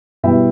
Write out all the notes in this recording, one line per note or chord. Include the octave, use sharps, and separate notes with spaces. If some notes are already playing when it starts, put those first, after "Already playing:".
B2 G3 B3 E4 E5 G5